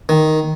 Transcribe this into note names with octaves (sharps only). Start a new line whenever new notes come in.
D#3